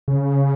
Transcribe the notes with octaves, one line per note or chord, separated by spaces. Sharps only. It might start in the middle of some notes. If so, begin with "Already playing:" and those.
C#3